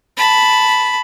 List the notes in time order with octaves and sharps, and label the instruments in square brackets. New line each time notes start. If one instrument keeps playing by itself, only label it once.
[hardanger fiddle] A5 B5